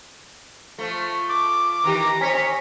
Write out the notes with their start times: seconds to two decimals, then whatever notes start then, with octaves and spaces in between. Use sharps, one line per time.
0.78 F3 A3
1.29 D6
1.84 D#3 E3 G4 A#5
2.21 C4 C#5 D#5 G#5 B6 C#7